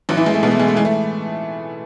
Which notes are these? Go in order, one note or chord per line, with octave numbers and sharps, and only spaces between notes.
A1 F#3 F#4
E3 E4
A1 G#3
A3
B2 G#3 B3
A3
G#3
A3
E3 G#3
A3